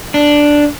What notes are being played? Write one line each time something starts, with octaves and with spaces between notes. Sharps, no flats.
D4